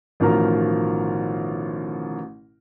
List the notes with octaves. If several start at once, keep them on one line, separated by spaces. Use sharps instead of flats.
A1 B2 D#3 F3 A#4 A#5